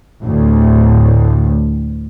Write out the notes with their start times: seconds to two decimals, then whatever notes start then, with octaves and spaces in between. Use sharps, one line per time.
0.22 D2 A2